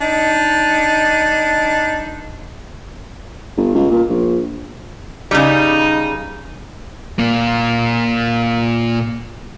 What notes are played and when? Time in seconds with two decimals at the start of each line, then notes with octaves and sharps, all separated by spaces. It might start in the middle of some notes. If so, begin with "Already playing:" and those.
0.01 D4 D#4
3.57 G1
3.75 C#2
3.91 A#2
4.09 A#1
5.31 C#3 G3 D#4
7.19 A#2 A#3